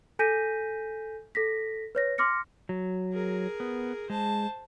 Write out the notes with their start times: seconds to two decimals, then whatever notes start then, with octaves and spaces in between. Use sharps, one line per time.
0.19 A4 G#5 G6 A#6 B6 D#7
1.35 A4 A#6 B6
1.95 B4 C#5 A#6
2.18 C6 D6 F6 A#6 C#7
2.69 F#3
3.12 G#4 A#4
3.60 B3
4.10 G#3 C5 A5